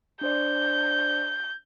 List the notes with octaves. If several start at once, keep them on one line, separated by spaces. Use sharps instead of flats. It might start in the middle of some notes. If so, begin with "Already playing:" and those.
D4 C5 D5 G6